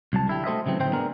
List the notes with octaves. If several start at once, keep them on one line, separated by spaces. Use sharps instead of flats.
C2 F#3 A5
D3 E4 G4
A3 F#4 A4 C5 D#5 E5
C#3 E3 F#3 C4
A2 D3 C4 D#4 C5 G5
B3 D4 G#4 A#4